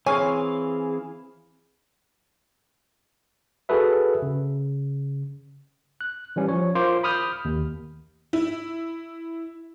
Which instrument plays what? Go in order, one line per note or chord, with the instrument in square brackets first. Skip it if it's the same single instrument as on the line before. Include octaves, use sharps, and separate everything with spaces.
[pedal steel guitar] E3 C4 F5 [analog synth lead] G#4 [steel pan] C#5 [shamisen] G#5
[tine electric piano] F#4 G#4 A4 B4 E5
C#3
F#6
E3 G3 C#4
F3 C#5
F4 A#4 C5 C6 D6
B5 D#6 F6 G6
D#2
[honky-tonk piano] E4